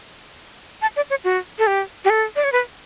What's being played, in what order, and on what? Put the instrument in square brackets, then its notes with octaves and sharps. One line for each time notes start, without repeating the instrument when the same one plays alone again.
[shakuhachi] A5
D5
C#5
F#4
A4
G4
G4
A4
D5
C#5
B4